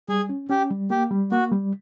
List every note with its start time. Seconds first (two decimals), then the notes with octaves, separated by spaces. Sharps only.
0.08 G3 G#4
0.29 C#4
0.50 C#4 G4
0.71 G3
0.90 A#3 G4
1.11 G3
1.32 A#3 F#4
1.52 G3